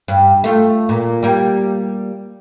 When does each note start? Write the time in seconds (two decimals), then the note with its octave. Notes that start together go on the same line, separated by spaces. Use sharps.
0.08 G2
0.44 A3 F4
0.89 A#2
1.23 G3 A#3